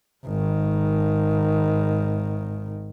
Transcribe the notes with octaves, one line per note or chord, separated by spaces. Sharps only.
G#1 D#3